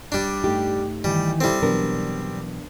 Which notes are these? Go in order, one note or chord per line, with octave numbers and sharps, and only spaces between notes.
G3 D4
G2 A3 D#4 G4
D#3 E3 G3
G3 C4 E4 A4 C5
B2 E3 F#3 B3 D4 A#4